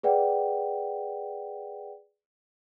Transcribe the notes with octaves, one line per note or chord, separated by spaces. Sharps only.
G#4 B4 D5 F#5 G5